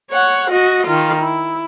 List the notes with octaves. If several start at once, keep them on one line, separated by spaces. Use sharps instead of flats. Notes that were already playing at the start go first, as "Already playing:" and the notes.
C#5 F#5
F#4 D#5
D#3 F4
E4